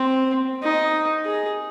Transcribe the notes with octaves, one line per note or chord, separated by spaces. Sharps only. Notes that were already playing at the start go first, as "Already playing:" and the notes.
Already playing: C4
D#4
G#4